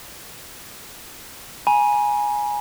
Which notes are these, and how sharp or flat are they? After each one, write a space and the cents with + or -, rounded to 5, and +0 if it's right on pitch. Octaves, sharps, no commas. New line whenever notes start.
G#5 +0 B5 -45